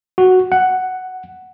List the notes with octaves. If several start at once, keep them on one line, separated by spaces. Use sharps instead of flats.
F#4
F#5